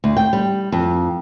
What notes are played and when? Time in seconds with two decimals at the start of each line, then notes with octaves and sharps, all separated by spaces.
0.04 D2
0.17 G5
0.33 G3
0.72 F2